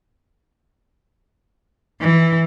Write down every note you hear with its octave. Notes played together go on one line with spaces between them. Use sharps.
E3